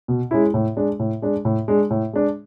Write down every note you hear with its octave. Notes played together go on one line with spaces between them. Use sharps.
B2
G#3 C#4 E4
A2
G#3 D4
A2
G#3 D4
A2
G#3 D4
A2
G#3 D4